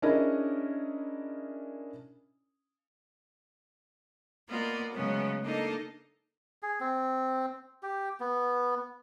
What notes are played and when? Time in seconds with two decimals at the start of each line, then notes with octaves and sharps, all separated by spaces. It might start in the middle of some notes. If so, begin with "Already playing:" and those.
0.02 C#4 D4 E4 G#4 A#4 D#5
4.48 A#3 B3 F4 D5 D#5
4.92 C#3 F#3 G#3 A3 B3 C#4
5.43 A#3 D4 D#4 A4 D#5 F5
6.63 G#4
6.80 C4
7.83 G4
8.20 B3